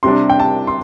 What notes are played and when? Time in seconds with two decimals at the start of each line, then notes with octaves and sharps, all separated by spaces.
0.03 C3 G3 D4 C6
0.30 G5
0.40 A5
0.67 C6